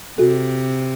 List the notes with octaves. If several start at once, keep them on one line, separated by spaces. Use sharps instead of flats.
C3 F#4 A4